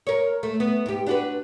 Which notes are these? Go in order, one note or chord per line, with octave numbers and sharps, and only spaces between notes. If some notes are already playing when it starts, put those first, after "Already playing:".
A#4 C#5
A3
B3
G#2 G4
D4 F#4 B4